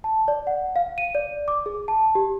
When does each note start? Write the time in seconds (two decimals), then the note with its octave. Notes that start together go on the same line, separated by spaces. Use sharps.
0.04 A5
0.28 D5
0.47 F#5
0.76 F5
0.98 D#7
1.15 D5
1.48 D6
1.66 G#4
1.88 A5
2.15 G4